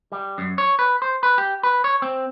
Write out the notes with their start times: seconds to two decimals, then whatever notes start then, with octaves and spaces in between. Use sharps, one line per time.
0.12 G3
0.38 F#2
0.58 C#5
0.79 B4
1.02 C5
1.23 B4
1.38 G4
1.63 B4
1.84 C#5
2.02 C4